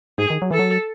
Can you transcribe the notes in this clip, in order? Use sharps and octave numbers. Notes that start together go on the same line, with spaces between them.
G#2 G#4
D#3
F#3
E3 A4
F#3